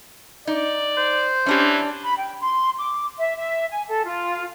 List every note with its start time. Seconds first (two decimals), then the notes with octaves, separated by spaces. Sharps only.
0.47 D#4 D5
0.97 C5
1.46 E3 C#4 D4 G4
2.02 B5
2.17 G5
2.40 C6
2.76 D6
3.19 E5
3.36 E5
3.70 G#5
3.87 A4
4.05 F4